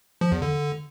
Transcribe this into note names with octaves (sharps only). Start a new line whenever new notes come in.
F3
E2
D3